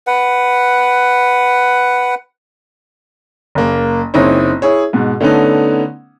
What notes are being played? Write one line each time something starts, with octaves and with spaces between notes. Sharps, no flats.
B4 F#5
F#1 A#3
F#1 C4 D#4 E4 C#5
E4 G#4 C#5
G#2 B2
D3 A3 B3 C#4 D#4